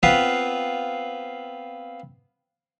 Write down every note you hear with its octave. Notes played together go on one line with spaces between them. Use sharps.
B3 C4 F4 B4 F5